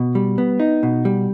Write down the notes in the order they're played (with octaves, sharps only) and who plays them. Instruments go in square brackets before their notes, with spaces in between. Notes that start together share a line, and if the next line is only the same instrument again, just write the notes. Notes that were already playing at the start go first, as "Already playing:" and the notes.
Already playing: [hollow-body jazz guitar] B2
G3
B3
D#4
B2
G3